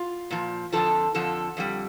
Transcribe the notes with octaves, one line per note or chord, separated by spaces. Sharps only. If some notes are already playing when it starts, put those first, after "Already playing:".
Already playing: F4
A#2 F3
F2 D3 F3 A4
F2 D3 F3 A4
F2 D3 G3